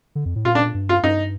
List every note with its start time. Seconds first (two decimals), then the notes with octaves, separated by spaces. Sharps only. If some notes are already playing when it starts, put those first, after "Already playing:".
0.15 D3
0.26 F2
0.36 A2
0.45 A#2 F4
0.55 D4
0.75 G2
0.89 F4
1.03 G2 D#4